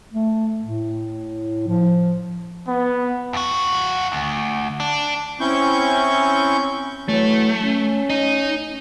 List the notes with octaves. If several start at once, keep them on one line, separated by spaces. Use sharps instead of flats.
A3
A2
F3
B3
F2 F#4
D2
D4
C4 C#4 E4 C#6 G6
E3 F#3 A3 C#5
C#4
D#4 D#5